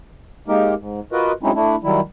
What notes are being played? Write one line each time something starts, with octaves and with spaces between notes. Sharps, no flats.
G#3 A#3 D#4 G4 A#4
G#2
F4 F#4 A#4 B4 D#5
F#3 G#3 C4 C#4 D#4 E4
A3 D4 E4
D#3 F#3 G3 E4